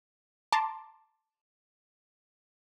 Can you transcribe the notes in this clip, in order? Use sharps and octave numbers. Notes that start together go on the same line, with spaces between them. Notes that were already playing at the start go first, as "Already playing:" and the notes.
A5 A#5 C6 D6